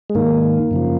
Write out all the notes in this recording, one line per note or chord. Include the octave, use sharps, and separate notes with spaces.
G#3
G#2 D#3 A#3
F#2 C#3 F3